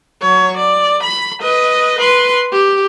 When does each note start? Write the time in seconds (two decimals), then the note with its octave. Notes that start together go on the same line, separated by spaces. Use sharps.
0.22 F#3 C#5
0.58 D5
1.04 B5
1.42 B4 D#5
1.99 B4 C6
2.52 G4